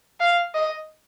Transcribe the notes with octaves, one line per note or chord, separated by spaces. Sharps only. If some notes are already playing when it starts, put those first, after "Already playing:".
F5
D#5